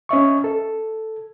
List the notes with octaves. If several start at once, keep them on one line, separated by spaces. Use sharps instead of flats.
C#4 D#5 E5 C#6
A4